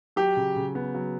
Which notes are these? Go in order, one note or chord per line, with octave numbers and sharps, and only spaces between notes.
F#3 G4
C#3
C#3
B3
F#3